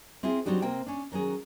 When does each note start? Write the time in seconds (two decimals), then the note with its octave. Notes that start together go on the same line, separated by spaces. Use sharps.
0.23 C4 E4 F4 G#4
0.46 F#3 C4 D4 D#4 G4
0.62 C3 A#3 C4 G5
0.86 C#4 D4
1.12 D#3 F#3 C#4 G#4